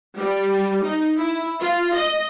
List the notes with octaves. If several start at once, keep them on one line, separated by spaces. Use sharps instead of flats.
G3
D#4
E4
F4
D#5